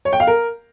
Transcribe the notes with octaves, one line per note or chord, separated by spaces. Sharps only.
C#5
G5
F5
A#4